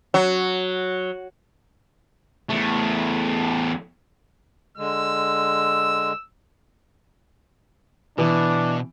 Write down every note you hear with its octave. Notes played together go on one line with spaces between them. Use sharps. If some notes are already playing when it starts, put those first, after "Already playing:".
F#3
E2 A3
D3 G#3 E6
B2 E3 D4